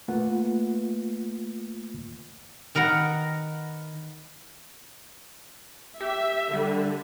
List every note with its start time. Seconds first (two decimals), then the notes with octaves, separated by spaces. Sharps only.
0.08 A3 A#3 F4 B4 F#5
2.75 D#3 A#4 B4 F#5
6.01 G4 E5
6.53 D3 G3